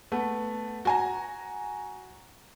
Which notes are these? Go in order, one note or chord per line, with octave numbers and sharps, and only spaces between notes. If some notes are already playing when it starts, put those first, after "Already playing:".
A3 B3
F#4 G#5 A#5